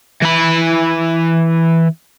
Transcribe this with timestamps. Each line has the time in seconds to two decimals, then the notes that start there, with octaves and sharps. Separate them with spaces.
0.22 E3 B5